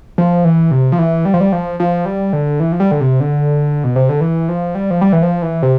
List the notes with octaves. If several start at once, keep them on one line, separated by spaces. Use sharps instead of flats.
F3
E3
C3
F3
E3
G3
F3
G3
F3
F3
G3
D3
E3
F3
G3
D3
C3
D3
B2
C3
D3
E3
F3
G3
F3
G3
E3
F3
E3
C3